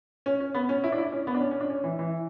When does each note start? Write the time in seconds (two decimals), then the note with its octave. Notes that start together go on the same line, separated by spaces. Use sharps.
0.26 C#4
0.40 C#4
0.54 B3
0.69 C#4
0.84 E4
0.92 D4
0.98 E4
1.12 C#4
1.27 B3
1.34 D4
1.40 C#4
1.51 C#4
1.60 D4
1.70 C#4
1.84 E3
1.99 E3